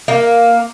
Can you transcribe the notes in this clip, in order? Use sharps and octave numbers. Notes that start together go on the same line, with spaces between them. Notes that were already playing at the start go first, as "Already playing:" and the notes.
A#3